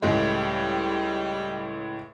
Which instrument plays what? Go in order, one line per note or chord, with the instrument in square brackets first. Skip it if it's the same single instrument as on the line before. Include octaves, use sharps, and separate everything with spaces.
[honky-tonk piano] C#2 A2 G#3 [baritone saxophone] G3